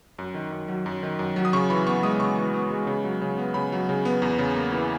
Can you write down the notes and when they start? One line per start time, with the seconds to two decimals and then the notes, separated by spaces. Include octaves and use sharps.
0.19 F#2
0.34 D#3
0.52 F#2
0.68 F#3
0.86 F#2
1.03 D#3
1.19 F#2
1.36 F#3
1.45 D#6
1.53 C#3 C#6
1.70 E3 B5
1.87 B3 C#6
2.03 G#3 D#6
2.20 C#3 C#6
2.38 E3
2.54 B3
2.71 G#3
2.87 C#3
3.04 F#3
3.21 C#3
3.38 B3
3.54 C#3 B5
3.72 F#3
3.89 C#3
4.05 B3
4.22 E2
4.39 C#3
4.56 A#3
4.73 E3